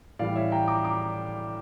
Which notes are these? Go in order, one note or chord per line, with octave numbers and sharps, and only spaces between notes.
A2 E3 G3 D5 F5
C#5 E5
G5 A#5
A#5 D6
A#5 D6